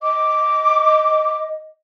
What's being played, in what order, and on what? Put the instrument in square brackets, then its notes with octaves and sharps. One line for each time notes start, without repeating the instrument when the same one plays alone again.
[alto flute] D#5 [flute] D6